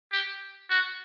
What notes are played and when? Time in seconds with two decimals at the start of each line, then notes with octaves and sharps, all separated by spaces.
0.12 G4
0.70 F#4